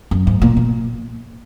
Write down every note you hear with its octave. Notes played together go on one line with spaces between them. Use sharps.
F#2
G#2
A#2
A#2